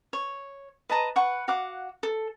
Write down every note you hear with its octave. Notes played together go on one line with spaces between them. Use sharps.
C#5
B4 D#5 A5 A#5
B4 F#5 C#6
F#4 F5 F#5 D6
A4